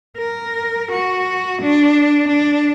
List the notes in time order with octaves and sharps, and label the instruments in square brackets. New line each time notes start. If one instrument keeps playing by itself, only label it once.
[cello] A#4
F#4
D4
D4